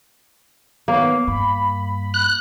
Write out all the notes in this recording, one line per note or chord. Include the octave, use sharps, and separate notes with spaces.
D#3 A#3 B3 C#5
G2 B5
F#6